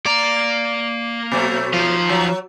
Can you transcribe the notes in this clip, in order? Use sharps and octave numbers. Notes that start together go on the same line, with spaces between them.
A#3 D5 A#5
B2 F#3 A3
F3 D#4 F5
F#3